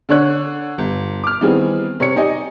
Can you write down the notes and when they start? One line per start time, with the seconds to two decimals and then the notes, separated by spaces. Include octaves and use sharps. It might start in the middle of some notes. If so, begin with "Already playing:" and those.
0.09 D3 D4 C#5 F#6
0.78 G1
1.24 D6 F6
1.41 D#3 E3 G3 B3 C4 G#4
2.00 C3 C#5 C#7
2.16 D#4 G4 D5 D#5 G#5